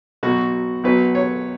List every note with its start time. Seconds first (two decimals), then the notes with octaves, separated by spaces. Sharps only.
0.23 B1 B2 F#3 F#4
0.84 B1 B2 F#3 B4
1.15 C#5